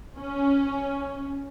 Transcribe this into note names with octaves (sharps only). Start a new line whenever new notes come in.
C#4